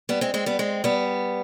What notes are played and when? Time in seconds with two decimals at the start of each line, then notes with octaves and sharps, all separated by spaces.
0.09 G3 B3
0.21 G#3 C4
0.34 G#3 C4
0.46 G3 B3
0.59 G#3 C4
0.84 G3 B3